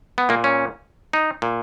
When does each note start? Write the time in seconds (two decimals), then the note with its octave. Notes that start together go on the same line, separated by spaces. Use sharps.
0.18 B3
0.29 A#2 A#3
0.44 C#4
1.13 D#4
1.42 A#2